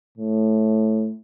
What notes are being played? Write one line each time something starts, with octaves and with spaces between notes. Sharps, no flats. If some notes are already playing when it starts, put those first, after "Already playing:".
A2